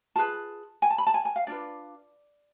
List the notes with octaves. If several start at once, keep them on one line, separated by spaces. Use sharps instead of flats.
F4 G#4 B4 A5
G#5
A5
B5
A5
G#5
G#5
F5
D4 F4 B4 D5